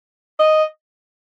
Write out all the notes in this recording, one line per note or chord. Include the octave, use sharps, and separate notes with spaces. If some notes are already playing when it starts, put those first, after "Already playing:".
D#5